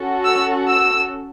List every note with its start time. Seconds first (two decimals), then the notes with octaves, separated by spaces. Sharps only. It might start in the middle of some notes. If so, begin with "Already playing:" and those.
Already playing: C#4 F#4 A4
0.25 E6
0.69 E6